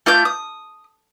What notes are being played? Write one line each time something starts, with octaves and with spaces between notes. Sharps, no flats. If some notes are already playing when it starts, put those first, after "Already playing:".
A3 F4 D6 G6
D#6